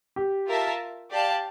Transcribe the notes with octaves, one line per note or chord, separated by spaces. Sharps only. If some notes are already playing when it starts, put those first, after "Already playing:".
G4
F4 A#4 E5 A5
G4 D5 F5 A5